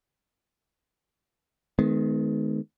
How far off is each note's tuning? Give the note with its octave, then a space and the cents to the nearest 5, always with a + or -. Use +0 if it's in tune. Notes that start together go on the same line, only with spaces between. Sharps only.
D#3 +0 G#3 +45 B3 +35